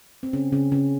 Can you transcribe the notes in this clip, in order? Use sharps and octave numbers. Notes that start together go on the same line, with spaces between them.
C4
C#3 C#4
C#3 C#4
C#3 C#4